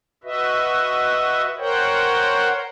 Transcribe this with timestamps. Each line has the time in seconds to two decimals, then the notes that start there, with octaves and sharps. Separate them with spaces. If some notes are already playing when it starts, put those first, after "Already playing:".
0.24 F#4 B4 D#5 E5
1.58 A#4 C5 C#5 F#5 G5